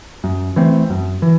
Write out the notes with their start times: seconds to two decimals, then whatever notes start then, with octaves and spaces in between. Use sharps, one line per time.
0.24 F#2
0.56 E3 A3 C4
0.90 F#2
1.22 E3